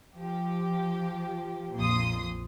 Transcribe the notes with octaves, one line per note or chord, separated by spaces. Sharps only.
F3 G4
A#1 F2 A#2 C6 D#6